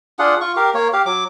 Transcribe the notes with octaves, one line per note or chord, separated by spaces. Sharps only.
D4 F4 G#4 F#5
F4 C#6
G4 A#4 F5
A#3 C#5
G4 F5
F#3 D6